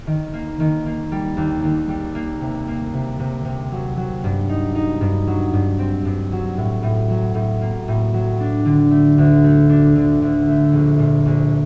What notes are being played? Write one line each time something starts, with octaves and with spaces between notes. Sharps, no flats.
D#3
A#3
D#3
A#3
G3
D#2
D#2
G3
A#3
C3
A#3
C3
C3
C3
F#3
F#3
G2
D#4
D#4
G2
F#3
G2
C4
G2
F#3
A2
A2
F#3
A2
A#3
A2
F#3
D4
D3
A3
D2
A3
D4
D3
D2
A3
A#1
A#2
A#1